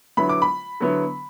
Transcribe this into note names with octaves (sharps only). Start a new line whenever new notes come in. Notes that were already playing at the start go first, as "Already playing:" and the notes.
D3 F#3 B3 E4 B5
D6
B5
D3 F#3 B3 E4